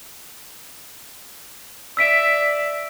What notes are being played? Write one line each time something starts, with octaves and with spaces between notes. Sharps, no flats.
D5 E5 E6 B6 D7